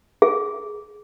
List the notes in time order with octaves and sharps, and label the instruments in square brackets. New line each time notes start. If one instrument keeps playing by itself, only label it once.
[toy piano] G#4